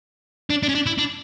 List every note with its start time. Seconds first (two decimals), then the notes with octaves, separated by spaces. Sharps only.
0.50 D4
0.63 D4
0.69 C#4
0.75 D4
0.86 E4
0.98 D4